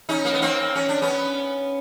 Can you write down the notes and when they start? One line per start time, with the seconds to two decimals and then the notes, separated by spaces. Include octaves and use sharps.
0.09 C#4 D#4
0.25 A#3
0.34 B3
0.42 A#3 C4
0.76 C#4
0.89 D4
1.02 B3 C#4